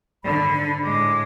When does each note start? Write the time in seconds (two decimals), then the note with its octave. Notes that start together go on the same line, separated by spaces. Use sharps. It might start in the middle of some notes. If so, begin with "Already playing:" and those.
0.24 G#2 D3 B5
0.84 A2 G#3 D6